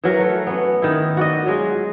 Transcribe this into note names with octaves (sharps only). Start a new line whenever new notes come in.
E3 F#3 A#4
A3
B3 C#4
D#3 E4
F#4 D5 D#5
F#3 G#3 F4